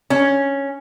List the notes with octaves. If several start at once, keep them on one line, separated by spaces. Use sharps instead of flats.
C#4